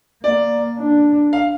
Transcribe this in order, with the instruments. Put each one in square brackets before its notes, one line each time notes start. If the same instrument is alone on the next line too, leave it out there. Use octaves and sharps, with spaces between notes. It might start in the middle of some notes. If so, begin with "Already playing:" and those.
[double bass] A#3 [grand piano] D5
[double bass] D4
[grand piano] F5